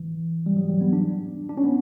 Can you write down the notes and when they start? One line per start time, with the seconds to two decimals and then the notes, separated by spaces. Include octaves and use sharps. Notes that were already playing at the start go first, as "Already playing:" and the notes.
Already playing: E3
0.46 G3
0.57 F#3
0.69 G3
0.81 B3
0.93 D4
1.49 D4
1.57 C#4
1.64 B3